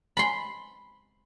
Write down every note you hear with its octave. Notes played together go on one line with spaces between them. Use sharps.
B5 C6